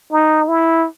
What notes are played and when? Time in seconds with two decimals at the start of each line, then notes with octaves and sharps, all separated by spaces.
0.12 D#4
0.48 E4